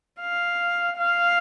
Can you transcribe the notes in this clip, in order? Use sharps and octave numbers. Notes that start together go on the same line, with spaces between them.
F5
F5